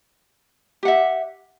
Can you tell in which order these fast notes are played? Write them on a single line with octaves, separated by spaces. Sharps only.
G4 F#5 E5